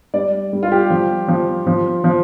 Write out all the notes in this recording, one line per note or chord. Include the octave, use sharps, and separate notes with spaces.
G3 D5
G3
F4
G4
F3
F3
F3
F3